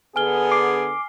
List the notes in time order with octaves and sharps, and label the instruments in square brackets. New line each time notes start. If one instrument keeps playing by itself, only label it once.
[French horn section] D3 B3 [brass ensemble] G#4 [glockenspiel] G#5 F6 G7
[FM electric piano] D6 [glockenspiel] C7